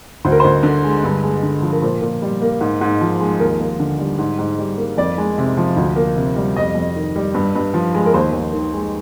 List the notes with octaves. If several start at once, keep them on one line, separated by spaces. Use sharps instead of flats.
D2 C5
A#4
D2 C5
D3
G#3
G2
G#3
D3
F3
A#4
A#2 C5
A#2
G3
A#3
G#2
G#2
F3
G#3
D#2 A#4
A#3
D3
G3
G#2
G#2
G3
A#3
F2 D5
G#3
C3
F3
D2
A#3
C3
G3
F2 D#5
F2
D#3
G3
G2
G2
F3
G#3
A#4
D#2 C5
D#2
D#3
G#3